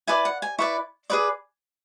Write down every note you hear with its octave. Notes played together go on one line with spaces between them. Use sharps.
E4 B4 D5 G#5
F#5
G#5
E4 B4 D5 C#6
G#4 B4 D5 D6